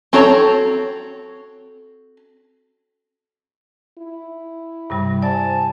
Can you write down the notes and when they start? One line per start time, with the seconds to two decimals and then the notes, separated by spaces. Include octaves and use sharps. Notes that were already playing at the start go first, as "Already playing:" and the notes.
0.13 C4 F#4 A4 C#5 A#5
3.98 E4
4.90 G2 C3 G3
5.22 G4 C5 D5 G#5 A5